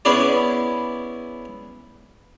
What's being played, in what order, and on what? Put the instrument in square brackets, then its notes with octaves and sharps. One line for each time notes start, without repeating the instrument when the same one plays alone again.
[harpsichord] B3 C#4 E4 G#4 D5